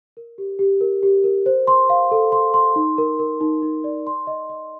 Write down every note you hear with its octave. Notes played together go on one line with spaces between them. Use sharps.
A#4
G4
G4
A#4
G4
A#4
C5
C6
F5
A4
C6
C6
D#4
A#4
A#4
D#4
D#4
D5
C6
D#5
D#5